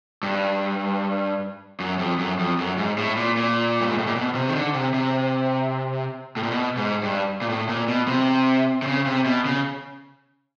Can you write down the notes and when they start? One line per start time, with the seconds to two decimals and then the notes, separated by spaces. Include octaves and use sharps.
0.23 G2
1.80 F#2
1.99 F2
2.19 F#2
2.39 F2
2.58 F#2
2.78 G#2
2.98 A2
3.17 A#2
3.37 A#2
3.81 G2
3.89 G#2
3.98 A2
4.07 A#2
4.16 B2
4.35 C3
4.48 D#3
4.55 D3
4.74 C3
4.94 C3
6.36 A2
6.43 A#2
6.51 B2
6.77 G#2
7.03 G2
7.42 A#2
7.49 A2
7.69 A#2
7.88 B2
8.08 C3
8.82 C3
8.87 C#3
9.06 C3
9.26 B2
9.45 C#3